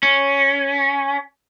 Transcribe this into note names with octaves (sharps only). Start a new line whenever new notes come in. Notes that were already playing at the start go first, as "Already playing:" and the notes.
C#4